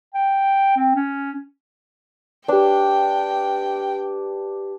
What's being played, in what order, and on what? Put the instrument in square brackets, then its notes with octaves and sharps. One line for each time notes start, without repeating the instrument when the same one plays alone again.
[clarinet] G5
C4
C#4
[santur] D4 [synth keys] G4 B4 [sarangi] G5